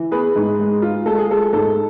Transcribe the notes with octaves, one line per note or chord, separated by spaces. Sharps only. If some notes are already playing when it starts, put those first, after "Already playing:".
Already playing: E3
B3 G#4 B4
G#2
G#3
F4
G#3 A4
G#4
G#3 A4
G#2 A4